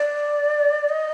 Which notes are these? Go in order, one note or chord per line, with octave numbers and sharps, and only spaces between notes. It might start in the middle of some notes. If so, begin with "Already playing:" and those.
Already playing: D5
D#5